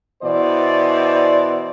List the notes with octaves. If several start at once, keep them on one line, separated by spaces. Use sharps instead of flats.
B2 E3 C5 D5